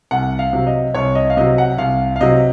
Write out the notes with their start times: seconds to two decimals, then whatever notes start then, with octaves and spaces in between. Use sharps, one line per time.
0.11 C2 F#5
0.39 F5
0.53 C3 F#3
0.67 D#5
0.94 C2 C#5
1.15 D#5
1.30 F5
1.37 C3 F#3 D#5
1.58 F#5
1.78 C2 F5
2.16 F5
2.21 C3 F#3 D#5